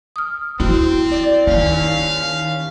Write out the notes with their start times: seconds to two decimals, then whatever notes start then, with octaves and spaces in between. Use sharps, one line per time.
0.16 D#6 F6
0.60 C4 D#4 E4 F#4
1.12 D5
1.47 D#2 D#3 C#4 F5